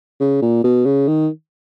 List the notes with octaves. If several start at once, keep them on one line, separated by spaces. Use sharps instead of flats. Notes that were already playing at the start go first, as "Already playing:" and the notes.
C#3
A#2
B2
C#3
D#3